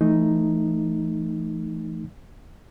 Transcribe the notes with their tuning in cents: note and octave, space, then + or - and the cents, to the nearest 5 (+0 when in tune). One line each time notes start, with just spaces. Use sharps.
E3 +25 A3 +0 D#4 +0